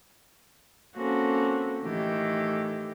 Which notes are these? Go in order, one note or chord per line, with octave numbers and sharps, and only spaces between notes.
A#3 C4 C#4 F#4 A4
A2 D#3 E3 G4